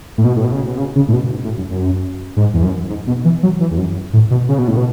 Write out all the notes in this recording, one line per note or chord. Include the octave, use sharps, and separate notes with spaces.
A2
B2
A2
B2
C#3
B2
C#3
C#3
A2
B2
G#2
A2
F#2
F#2
G#2
E2
F#2
G#2
B2
E3
F#3
E3
E2
F#2
A2
B2
C#3
B2
A2
B2